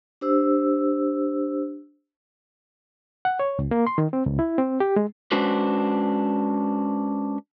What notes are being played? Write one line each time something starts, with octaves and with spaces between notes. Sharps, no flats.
D4 G4 C5 E6
F#5
C#5
C#2
A#3
C6
D#3
C4
C#2
E4
C4
G4
G#3
G#3 C#4 D4 F#4 B4 C5